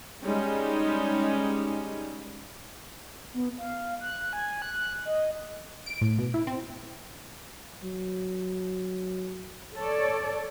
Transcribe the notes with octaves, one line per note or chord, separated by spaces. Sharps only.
G3 G#3 C#4 D#4 G4
B3
F5
F#6
G#5
F#6
D#5
D7
A2
B2
E4
C4
F#3
A4 C#5 D5